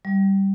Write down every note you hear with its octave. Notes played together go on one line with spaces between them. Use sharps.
G3